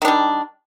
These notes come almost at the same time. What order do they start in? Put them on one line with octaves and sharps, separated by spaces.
D#3 D4 G3